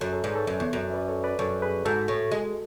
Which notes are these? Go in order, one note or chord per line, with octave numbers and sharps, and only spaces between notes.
F#2 A4 C#5
A4 C#5
G#2 B4 D5
A4 C#5
F#2
E2
F#2
B4 D5
A4 C#5
B4 D5
F#2 A4 C#5
G#4 B4
G#2 F#4 A4
A2
G#3